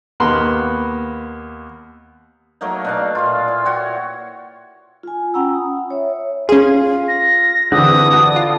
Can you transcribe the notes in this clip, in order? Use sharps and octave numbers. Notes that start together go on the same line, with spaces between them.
D#2 A#3 B3 B5 C6
F#3 A3 A#3 D#4
B2 D4 F5
A#2 F4
E4
F#4 C#5 G5
F4 G#5
C#4 F#5 G5 A#5 B5 E6
D#6
C#5 E5
C#4 F4 G#4
A#6
D3 E3 C4 F#5 D#6
F#4 A4 D5
F4